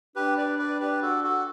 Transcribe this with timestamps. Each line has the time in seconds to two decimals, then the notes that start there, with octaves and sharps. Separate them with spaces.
0.16 D4 G4 B4
0.38 B4 D5
0.59 B4 D5
0.80 G4 B4
1.02 F#4 A4
1.24 F#4 A4